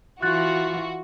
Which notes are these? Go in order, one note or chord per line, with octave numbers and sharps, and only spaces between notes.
E3 F4 F#4 F#6 A6